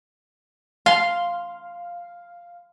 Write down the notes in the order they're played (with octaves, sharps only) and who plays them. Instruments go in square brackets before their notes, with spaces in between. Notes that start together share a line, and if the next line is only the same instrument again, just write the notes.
[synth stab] F5 [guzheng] C6